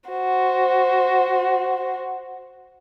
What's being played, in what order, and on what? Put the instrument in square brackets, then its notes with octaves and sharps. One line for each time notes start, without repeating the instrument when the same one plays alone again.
[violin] F#4 C5